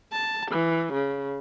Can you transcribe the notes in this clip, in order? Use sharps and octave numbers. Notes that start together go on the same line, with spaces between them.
A5
E3
C#3